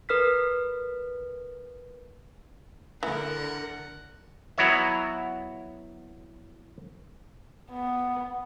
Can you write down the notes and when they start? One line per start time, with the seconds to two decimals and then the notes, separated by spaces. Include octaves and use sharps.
0.09 A#4 B4 F6 B6
3.03 D3 E3 E4 A#4 F#5
4.58 F#3 B3 E4 F#4 C#5 E5
7.71 B3